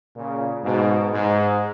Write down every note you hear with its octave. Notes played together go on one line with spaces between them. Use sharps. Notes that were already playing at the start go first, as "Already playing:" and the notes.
A#2 C#3
G#2 B2
G#2